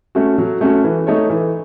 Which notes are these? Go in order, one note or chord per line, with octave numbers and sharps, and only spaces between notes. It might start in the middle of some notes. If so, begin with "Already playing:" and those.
A3 C#4 F#4
F#3
A3 C#4 F#4
E3
A3 D#4 A4 C#5
E3